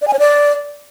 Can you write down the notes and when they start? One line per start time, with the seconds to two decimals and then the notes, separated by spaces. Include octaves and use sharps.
0.02 D5
0.07 G#5
0.13 C#5
0.19 D5